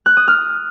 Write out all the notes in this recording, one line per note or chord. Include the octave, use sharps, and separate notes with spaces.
F#6
D#6
F6